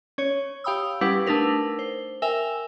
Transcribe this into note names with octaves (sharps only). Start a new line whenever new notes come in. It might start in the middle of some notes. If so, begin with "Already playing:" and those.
C#4 C#5
G4 F5 G5 B5 D#6 E6
G3 C#4 E4 G4 B4 F#5
A3 D4 D#4 A#4 B4
C5
A#4 E5 G5 G#5 E6